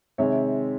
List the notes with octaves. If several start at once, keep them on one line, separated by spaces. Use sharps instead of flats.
C3 D#3 G#3 C#5 E5